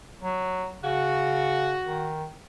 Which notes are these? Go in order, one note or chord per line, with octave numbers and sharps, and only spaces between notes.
F#3
C#3 F#4
D#3